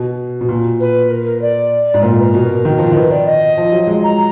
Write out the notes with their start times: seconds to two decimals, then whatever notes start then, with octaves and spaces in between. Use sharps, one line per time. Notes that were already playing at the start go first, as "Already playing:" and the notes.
Already playing: B2
0.41 B2
0.49 A#2
0.80 B4
1.10 A#4
1.26 A#4
1.42 D5
1.94 G#2
2.02 A#2 A#4
2.19 B4
2.23 A#4
2.34 B2
2.65 D#3
2.78 F3
2.92 D#3 B4
3.11 D5
3.26 D#5
3.57 F3
3.72 F#3
3.87 G#3
4.04 A#5